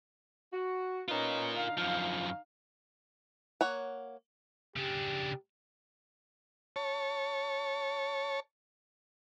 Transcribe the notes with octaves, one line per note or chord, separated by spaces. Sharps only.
F#4
B3 C#4 D#4 F4 A#4
D3 D#4 F5
F#2 F3
A#3 C#5 F#5
C#3 D4 G4
C#5 A5